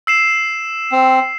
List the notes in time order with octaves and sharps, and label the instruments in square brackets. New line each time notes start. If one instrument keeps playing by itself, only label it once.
[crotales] E6 C7 E7
[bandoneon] C4